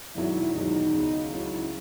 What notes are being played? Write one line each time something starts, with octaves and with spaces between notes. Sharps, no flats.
E1 E2 D#3 F#3 E4
E1 E2 D#3 F#3 D#4
C#2 C#3 F#3
C#2 C#3 F#3 E4